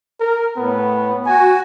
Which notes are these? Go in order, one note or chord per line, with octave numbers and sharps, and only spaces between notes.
A#4
A2 B3
F#4 G#5